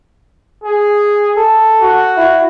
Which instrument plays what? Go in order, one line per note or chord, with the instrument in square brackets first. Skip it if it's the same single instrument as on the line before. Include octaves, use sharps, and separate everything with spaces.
[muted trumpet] G#4
[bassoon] A4
[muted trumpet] F#4
[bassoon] E4